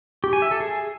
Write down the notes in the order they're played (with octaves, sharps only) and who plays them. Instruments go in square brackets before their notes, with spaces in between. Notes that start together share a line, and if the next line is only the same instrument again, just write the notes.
[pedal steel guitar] G4
G#5
E5
A4
G#4